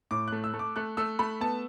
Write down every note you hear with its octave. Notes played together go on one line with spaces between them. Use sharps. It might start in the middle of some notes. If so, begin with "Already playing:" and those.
A2 D6
A3 F#6
E6
A3
D6
A3 F#6
A3 E6
A3 B5
B3 A5